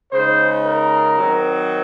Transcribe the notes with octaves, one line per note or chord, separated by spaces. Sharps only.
C#3 G#3 D#4 C5
A#4
D#3 F#3 C4